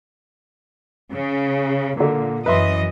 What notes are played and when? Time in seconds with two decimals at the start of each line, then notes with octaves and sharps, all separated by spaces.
1.13 C#3
1.97 A#2 D3 A#3
2.46 F#2 E3 B4 D#5 E5 C6